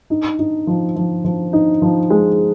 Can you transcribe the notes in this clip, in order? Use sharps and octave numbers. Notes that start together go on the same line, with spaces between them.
D#4
D#4
F3
F3
F3
D#4
F3
G#3